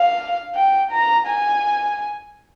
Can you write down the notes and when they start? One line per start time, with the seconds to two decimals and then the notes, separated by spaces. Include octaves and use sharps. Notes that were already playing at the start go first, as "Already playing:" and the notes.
Already playing: F5
0.55 G5
0.92 A#5
1.27 G#5